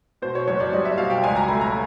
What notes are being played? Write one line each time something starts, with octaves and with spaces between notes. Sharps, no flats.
B2 C5
C#5
F#1 C#5
D5
G3 D#5
E5
B2 F5
G5
C#2 G#5
A#5
A3 B5
A#5